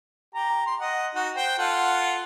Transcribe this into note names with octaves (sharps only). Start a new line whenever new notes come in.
G4 A#5
C6
D#5 F#5
D#4 F#4
C5 G5
F4 A4 F#5